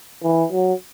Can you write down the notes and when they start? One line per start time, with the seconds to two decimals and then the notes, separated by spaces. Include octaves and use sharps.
0.23 E3
0.53 F#3